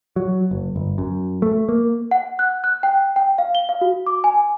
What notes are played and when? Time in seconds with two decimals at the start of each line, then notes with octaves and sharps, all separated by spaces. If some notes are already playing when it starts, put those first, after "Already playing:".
0.16 F#3
0.51 F#1
0.76 G1
0.98 F#2
1.42 A3
1.69 A#3
2.11 F#5
2.39 F#6
2.64 F#6
2.83 G5
3.16 G5
3.38 F5
3.55 G7
3.69 F5
3.81 F#4
4.07 D6
4.24 G#5